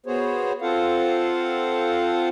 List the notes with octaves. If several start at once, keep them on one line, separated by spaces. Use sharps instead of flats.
B3 F#4 G#4 C5 C#5
C4 F4 A4 C5 F5 F#5